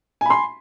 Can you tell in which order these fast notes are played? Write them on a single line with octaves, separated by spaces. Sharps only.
G#5 B5 C6